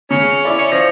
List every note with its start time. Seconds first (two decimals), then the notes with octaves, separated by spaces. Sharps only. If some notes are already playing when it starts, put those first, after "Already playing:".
0.11 C#3 C#4
0.45 E4 D5
0.58 C#4
0.72 F3 A#6